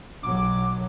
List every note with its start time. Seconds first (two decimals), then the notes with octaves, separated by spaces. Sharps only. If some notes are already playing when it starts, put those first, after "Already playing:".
0.23 B1 F#3 D6